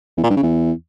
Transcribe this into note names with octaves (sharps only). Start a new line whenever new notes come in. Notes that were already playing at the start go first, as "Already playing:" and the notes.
E2
A#2
G2
C#3
E2